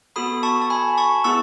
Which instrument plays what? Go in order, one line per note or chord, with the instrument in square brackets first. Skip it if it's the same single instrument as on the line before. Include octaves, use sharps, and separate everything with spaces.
[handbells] B3 F#4 A4 B5 D#6
A5 C#6
A5
G#5 B5
A5 C#6
B3 E4 G#4 C#6 E6